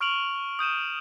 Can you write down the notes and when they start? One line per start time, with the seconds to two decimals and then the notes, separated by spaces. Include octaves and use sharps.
0.01 C#6 F6 D7 F7 F#7
0.59 D#6 G6 D#7 E7